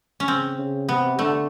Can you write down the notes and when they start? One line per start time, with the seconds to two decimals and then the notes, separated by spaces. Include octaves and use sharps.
0.20 C#4
0.27 C#3 C4
0.59 C#3
0.89 C3 B3
1.19 D3 A3